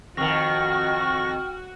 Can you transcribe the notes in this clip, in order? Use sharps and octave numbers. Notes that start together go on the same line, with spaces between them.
F2 D#3 F#4 G5 C#6 F6 A#6